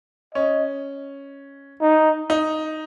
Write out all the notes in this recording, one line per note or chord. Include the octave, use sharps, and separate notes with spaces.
C#4 D#5
D#4
D#4